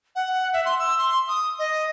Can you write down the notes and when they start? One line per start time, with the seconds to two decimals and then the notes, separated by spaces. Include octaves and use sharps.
0.16 F#5
0.53 E5
0.65 C6
0.79 E6
0.98 C6
1.28 D#6
1.59 D#5